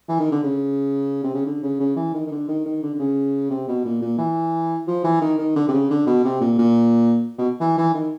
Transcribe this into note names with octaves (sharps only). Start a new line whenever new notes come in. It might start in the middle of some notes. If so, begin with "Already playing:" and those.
E3
D#3
D3
C#3
C3
C#3
D3
C#3
C#3
E3
D#3
D#3
D3
D#3
D#3
D3
D3
C#3
C3
B2
A#2
A#2
E3
F3
E3
D#3
D#3
D3
C3
C#3
D3
B2
C3
A#2
A#2
B2
E3
E3
D#3